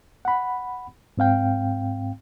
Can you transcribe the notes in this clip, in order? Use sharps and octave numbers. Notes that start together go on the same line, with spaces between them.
F#5 B5
G#2 C4 F5 G5